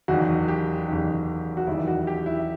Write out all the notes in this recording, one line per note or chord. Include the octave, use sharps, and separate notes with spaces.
F#1 E2 D#3 F#4
G4
F#1 E2 D#3
F#4
F#1 E2 D#3 G3 E4
F#4
G4
E4